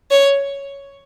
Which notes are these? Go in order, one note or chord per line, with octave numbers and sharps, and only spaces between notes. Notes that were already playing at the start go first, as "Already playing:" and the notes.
C#5